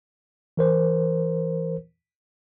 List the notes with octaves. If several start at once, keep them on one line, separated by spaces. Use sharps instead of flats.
E3 A#4 C5